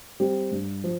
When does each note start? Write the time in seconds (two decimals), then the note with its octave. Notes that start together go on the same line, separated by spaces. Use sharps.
0.20 G3 C4 G4
0.51 G2
0.84 F3